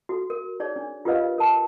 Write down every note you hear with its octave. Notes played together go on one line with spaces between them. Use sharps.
F#4 A4
A#4
D#4 G#4 C#5 D5
D4
F4 G4 A#4 B4 D#5 F5
A#4 A5